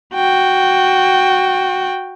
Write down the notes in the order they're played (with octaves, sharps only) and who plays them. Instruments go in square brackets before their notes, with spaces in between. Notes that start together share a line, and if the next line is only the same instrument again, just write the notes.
[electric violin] F#4 G5